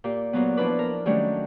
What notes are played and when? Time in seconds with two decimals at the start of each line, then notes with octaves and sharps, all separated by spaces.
0.04 A#2 G4
0.33 A#2 F#3 B3
0.57 F3 D4 E4 B4 D6
0.79 A#4
1.06 D#3 F#3 G3 A3 C#4 D4